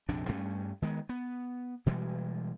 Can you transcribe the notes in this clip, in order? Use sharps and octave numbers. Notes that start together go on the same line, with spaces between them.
A#1 F2 C3 D4
G2 G3 A3 C#4
D#3 G#3 B3
B3
B2 E3 G3 G#3